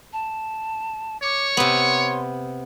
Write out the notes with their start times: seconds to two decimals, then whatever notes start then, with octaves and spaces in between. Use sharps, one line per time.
0.13 A5
1.23 C#5 D6
1.57 C3 B3 C6